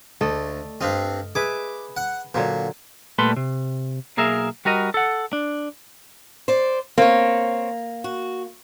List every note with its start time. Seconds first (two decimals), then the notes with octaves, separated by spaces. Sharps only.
0.21 D2 A3 D5 D#5
0.81 G2 C4 D#5 F5
1.35 G#4 B4 E5 D6
1.97 F#5
2.34 A#2 D3 F#3 C5
3.19 A#2 G3 A3 B4 B5 C6
3.36 C3
4.17 B1 A#3 G#4 A#4 E5
4.65 G3 F#4 A#4 D#5
4.94 A4 F#5
5.33 D4
6.48 C5 D5
6.98 A#3 C4 C#5
8.04 F#4